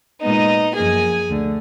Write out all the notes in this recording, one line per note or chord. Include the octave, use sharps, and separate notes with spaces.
A#2 G#3 B3 D#4 D#5
F#2 F3 A#3 G#4 G#5
D2 D3